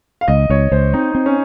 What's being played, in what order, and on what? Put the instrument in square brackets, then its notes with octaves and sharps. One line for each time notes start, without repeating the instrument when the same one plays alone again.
[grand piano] F5
[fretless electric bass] C#2 [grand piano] D#5
[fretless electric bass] C#2 [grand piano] C#5
[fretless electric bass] C#2 [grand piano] C5
[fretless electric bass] C4 [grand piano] D#4
[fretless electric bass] C4
[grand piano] C#4